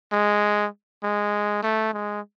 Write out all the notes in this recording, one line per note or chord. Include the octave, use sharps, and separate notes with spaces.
G#3
G#3
A3
G#3